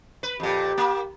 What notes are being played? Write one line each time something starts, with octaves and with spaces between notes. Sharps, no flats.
B4
F2 A#2 G4
A#3